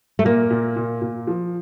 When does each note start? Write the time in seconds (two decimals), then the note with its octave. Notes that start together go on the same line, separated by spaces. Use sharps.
0.19 A3
0.25 A#2 A#3
0.50 A#2
0.76 A#2
1.02 A#2
1.27 F3